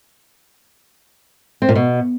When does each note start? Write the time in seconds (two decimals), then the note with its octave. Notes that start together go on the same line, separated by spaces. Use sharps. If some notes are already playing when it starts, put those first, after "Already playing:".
1.62 C4
1.69 A#2
1.75 B2